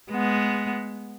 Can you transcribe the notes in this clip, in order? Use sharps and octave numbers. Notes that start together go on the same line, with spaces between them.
G#3 B3